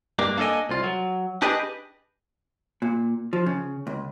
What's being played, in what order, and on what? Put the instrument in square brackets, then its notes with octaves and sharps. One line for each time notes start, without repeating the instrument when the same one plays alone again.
[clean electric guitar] G2 A#3 D4
A#3 D4 A4 C#5 D#5 G#5
C2 F4
F#3
D4 G4 G#4 B4 D#5
[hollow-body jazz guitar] A#2
F3
C#3
C#2